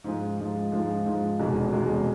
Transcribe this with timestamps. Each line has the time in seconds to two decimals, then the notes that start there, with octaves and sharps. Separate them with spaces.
0.04 G#2 F3 G#3
0.38 G#2 F3 G#3
0.72 G#2 F3 G#3
1.05 G#2 F3 G#3
1.39 F1 E2 B2 G#3
1.73 F1 E2 B2 G#3